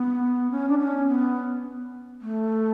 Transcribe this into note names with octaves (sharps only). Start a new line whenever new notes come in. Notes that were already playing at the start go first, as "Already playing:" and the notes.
Already playing: B3
C#4
D4
C#4
B3
A3